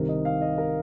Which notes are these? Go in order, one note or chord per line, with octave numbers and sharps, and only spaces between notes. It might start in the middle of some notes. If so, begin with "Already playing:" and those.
Already playing: C2 C3 D#3 C4 A#4
D#5
F5
D#5
A#4